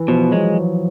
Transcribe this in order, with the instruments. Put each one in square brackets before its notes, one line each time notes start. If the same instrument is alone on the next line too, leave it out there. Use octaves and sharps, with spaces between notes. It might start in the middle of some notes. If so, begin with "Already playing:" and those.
Already playing: [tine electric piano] E3
[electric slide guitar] B2 [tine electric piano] F3
[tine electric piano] F#3 [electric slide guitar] G#3